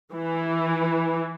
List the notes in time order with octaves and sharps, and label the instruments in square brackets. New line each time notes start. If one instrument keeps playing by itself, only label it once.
[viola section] E3